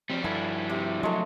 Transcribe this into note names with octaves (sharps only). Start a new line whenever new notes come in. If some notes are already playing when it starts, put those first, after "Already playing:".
F3 G3 C4
G2 D3 E4 G#5
C3
F#3 G#3 A3